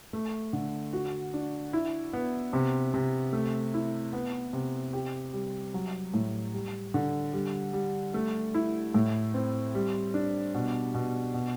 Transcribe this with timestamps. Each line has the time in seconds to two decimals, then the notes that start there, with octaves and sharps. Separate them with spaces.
0.13 A3
0.53 D3
0.93 F#4
1.34 D4
1.73 E4
2.13 B3
2.53 C3
2.94 C3
3.33 A3
3.74 E4
4.13 B3
4.53 C3
4.93 G4
5.33 G3
5.74 F#3
6.14 A2
6.54 G3
6.94 D3
7.33 G3
7.73 G3
8.14 A3
8.54 E4
8.94 A2
9.34 C4
9.75 G3
10.14 D4
10.54 B2
10.94 B2
11.34 B2